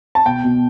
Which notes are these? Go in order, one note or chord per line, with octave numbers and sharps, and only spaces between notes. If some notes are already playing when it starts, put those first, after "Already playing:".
A5
B2 G5
B2